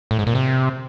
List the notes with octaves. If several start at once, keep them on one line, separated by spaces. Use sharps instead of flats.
A2
G#2
A#2
C3